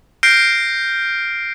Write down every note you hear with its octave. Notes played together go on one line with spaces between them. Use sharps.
F6 G6 A#6 C7 D7